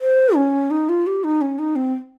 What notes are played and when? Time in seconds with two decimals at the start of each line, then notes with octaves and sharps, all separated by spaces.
0.01 C5
0.35 C#4
0.70 D#4
0.89 F4
1.07 G4
1.24 D#4
1.41 C#4
1.59 D#4
1.76 C4